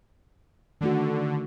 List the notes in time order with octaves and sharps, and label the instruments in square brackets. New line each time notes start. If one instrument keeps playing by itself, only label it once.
[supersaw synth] D3 [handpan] D#3 A3 F#4